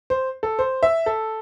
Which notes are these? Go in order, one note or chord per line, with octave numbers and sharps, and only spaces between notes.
C5
A4
C5
E5
A4